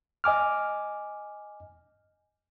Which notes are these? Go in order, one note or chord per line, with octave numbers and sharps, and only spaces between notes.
D#5 G#5 D6 F6